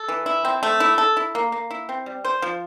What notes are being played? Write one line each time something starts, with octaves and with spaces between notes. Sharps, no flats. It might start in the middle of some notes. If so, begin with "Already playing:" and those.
Already playing: A4
E3
E4
C4
A3
E4
A4
E4
A#3
A#3
E4
C4
G3
C5
F3